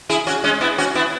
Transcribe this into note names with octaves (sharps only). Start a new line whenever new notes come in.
E4 G#4
C#4 F#4
G#3 C#4
B3 E4
C#4 F#4
B3 E4